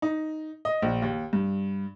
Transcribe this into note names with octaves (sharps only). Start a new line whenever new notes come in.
D#4
D#5
A#1
D#2
G2